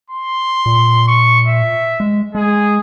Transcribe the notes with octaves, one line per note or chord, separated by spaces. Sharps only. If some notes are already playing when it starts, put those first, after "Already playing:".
C6
A#2
C#6
E5
G#3
G#3 G#4